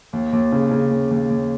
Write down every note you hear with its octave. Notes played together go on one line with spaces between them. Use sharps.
D#2
D#2
C#3
C#3
D#2
D#2
D#2